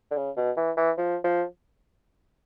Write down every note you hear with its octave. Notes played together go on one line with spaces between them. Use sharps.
D3
C#3
B2
E3
E3
F3
F3